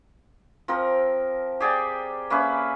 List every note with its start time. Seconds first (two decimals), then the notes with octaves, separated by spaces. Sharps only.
0.68 F3 C4 A#4
1.60 G4 G#4 D5 G5
2.30 A#3 C#4 B4 E5